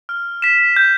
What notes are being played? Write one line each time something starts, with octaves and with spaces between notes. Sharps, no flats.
F6
B6 E7
G6